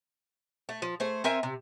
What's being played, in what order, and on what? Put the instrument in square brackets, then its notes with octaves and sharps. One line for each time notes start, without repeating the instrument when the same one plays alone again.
[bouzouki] A3
F3
A3 G#4 C5
C4 A#4 E5 G#5
C3